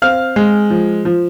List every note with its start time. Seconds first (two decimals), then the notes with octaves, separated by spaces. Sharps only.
0.02 C4 F5 F6
0.36 G#3
0.70 F3
1.05 F3